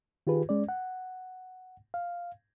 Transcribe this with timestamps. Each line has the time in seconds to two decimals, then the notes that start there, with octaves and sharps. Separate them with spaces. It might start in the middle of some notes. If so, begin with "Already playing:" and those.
0.27 D#3 F4 G4 G#4 B4
0.49 G#3 C#4 D5
0.69 F#5
1.94 F5